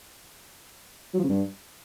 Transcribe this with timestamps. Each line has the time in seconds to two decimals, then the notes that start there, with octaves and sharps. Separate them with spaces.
1.14 F#3
1.19 F3
1.24 C#3
1.29 G2